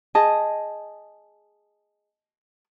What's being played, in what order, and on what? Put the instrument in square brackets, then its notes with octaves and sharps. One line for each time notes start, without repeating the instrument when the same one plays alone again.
[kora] G#4 D#5 [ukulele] A5